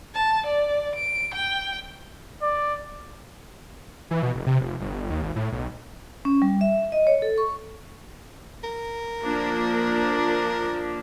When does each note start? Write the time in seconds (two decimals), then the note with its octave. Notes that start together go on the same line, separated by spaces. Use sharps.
0.14 A5
0.47 D5
0.96 D7
1.35 G5
2.42 D5
4.11 E3
4.22 B2
4.35 F1
4.47 C3
4.61 F1
4.80 G1
5.10 D#2
5.22 G#1
5.36 A2
5.52 B1
6.25 C#4
6.42 G3
6.61 E5
6.92 D#5
7.07 C#5
7.22 A4
7.38 C#6
8.64 A#4
9.21 F3 A#3 D4